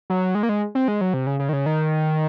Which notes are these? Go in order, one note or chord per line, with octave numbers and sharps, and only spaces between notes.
F#3
G#3
A#3
G#3
C4
G#3
F#3
C3
C#3
C#3
D#3
C#3
D#3